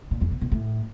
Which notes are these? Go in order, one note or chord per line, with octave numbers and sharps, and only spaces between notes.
A#2
F2
B2
B2
A2